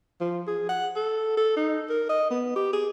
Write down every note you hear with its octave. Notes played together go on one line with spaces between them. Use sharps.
F3
G#4
F#5
A4
A4
D#4
A#4
D#5
B3
G4
G#4